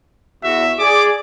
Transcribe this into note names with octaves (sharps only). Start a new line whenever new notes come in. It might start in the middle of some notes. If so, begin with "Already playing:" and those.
E2 F#4 E5
G#4 D5 D6